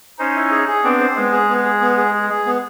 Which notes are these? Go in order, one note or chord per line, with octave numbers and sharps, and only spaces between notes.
C#4 D#4 C5
E4
G#4
G#4
B3 C4 D4
C5
G#3 B3
G#4
B3
G#4
B3
G#4
G#4
G#4
B3